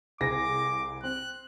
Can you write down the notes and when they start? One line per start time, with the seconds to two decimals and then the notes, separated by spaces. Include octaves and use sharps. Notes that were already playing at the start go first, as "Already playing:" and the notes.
0.20 C2 G#4 D6 A#6
1.03 C4 F#6